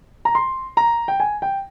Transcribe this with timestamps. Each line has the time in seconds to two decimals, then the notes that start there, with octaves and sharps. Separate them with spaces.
0.25 A#5
0.35 C6
0.77 A#5
1.08 G5
1.20 G#5
1.42 G5